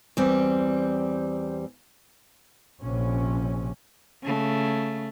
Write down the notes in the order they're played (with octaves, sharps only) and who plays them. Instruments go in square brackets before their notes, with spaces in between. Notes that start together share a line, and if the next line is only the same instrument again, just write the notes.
[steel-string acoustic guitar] E2 G3 C4
[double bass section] A#1 C3 C#4
[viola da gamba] C#3 A3